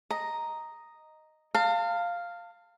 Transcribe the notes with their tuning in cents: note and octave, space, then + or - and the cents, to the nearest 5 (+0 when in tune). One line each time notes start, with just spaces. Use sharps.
D#5 +0 A#5 +0
F5 +0 A5 +40